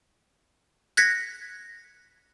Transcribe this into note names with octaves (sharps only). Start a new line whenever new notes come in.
F#6 G#6 A#6 B6 C#7